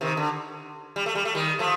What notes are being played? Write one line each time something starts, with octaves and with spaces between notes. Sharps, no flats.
C3 D#3
D3
G3
A3
G3
A3
D#3 G3
F3 A3